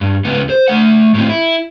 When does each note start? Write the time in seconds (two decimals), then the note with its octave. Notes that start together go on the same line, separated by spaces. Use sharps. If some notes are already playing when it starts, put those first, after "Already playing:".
0.01 G2
0.25 C#2 B3
0.50 C5
0.68 A3 F#5
1.14 A2 C4
1.29 E4